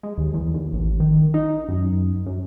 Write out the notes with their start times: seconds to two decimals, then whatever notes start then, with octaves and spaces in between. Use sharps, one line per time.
0.03 G#3
0.18 D#2
0.34 E2
0.54 D#2
0.73 A1
1.00 D#3
1.34 D#4
1.69 F#2
2.26 F#2